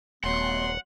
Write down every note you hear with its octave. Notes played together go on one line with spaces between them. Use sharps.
D#1 F#3 A3 B3 F#5 C6